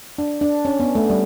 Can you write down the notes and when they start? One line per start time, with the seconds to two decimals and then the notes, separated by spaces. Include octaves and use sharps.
0.18 D4
0.41 D4
0.65 C#4
0.80 B3
0.95 A3
1.10 G3